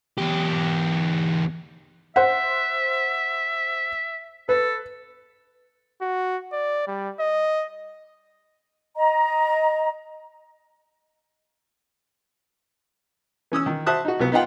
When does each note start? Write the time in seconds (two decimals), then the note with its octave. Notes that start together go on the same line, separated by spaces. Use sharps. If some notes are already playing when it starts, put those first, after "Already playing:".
0.18 E2 G4
2.16 C5 E5 F#5
4.49 A4 B4
6.01 F#4
6.53 D5
6.87 G3
7.20 D#5
8.95 D#5 A#5
13.52 E3 C#4 D#6 E6
13.66 D#3
13.86 F#4 C5 E5 A5 D#6 F#6
14.05 D#4 F#4
14.20 C2 F#3 B3
14.32 B3 D#4 F4 F#5 G5